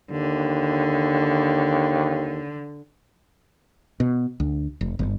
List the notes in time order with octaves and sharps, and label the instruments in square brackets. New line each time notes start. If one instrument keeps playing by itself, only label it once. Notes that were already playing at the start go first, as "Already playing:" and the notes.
[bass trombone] D#2 [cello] D3
[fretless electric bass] B2
D2
F1
G1